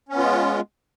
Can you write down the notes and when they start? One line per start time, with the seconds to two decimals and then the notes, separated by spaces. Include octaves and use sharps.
0.09 C#4
0.13 B3
0.18 F4
0.23 G#3